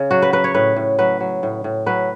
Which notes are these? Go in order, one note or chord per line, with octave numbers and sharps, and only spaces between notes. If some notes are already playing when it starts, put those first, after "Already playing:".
Already playing: C#3
F#3 F#4
B4
F#3 B4
C#5
A2 B4
A2
F#3 B4
F#3
A2
A2
F#3 B4